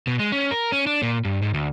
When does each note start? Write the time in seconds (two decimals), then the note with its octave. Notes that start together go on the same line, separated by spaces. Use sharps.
0.07 B2
0.19 G#3
0.32 C#4
0.51 A#4
0.72 C#4
0.87 D4
1.02 A#2
1.25 G2
1.42 G#2
1.54 D2